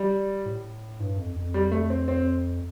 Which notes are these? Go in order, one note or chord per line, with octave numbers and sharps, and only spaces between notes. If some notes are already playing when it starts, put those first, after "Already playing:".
Already playing: G3
A2
G2
F2
F2
G3
A3
C4
C4